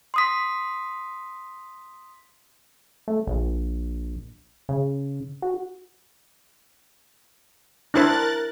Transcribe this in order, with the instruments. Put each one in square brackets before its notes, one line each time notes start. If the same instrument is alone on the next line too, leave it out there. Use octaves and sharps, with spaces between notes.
[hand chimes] C6 D#6 B6
[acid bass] A3
A#1
C#3
F#4
[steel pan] D4 E4 C5 [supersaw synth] A#4 F#6 A6